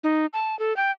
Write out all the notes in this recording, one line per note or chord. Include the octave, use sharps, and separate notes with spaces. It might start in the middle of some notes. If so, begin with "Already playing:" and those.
D#4
A5
A4
G5